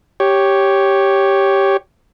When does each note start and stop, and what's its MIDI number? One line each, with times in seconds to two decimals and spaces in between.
0.20 1.77 67
0.20 1.77 73